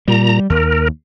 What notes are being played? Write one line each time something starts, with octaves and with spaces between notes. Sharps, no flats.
A#2 G3 A#5
D#2 A#4